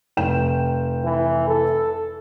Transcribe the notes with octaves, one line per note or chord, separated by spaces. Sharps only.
F1 G5 E7
E3
A4